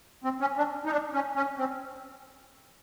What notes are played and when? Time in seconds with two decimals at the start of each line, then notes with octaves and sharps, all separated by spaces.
0.24 C4
0.41 C#4
0.58 D4
0.85 D#4
0.91 D4
1.13 C#4
1.35 C#4
1.58 C4